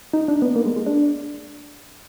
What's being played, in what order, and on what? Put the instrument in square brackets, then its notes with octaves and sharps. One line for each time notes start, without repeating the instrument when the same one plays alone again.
[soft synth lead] D#4
D4
B3
A#3
G#3
G#3
D4